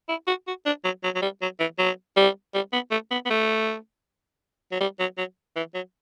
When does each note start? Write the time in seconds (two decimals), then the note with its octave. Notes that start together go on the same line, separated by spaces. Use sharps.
0.09 E4
0.27 F#4
0.47 F#4
0.66 D4
0.84 F#3
1.03 F#3
1.15 F#3
1.22 G3
1.41 F#3
1.60 E3
1.78 F#3
2.17 G3
2.54 G3
2.73 B3
2.91 A3
3.11 B3
3.25 B3
3.30 A3
4.72 F#3
4.80 G3
5.00 F#3
5.18 F#3
5.56 E3
5.74 F#3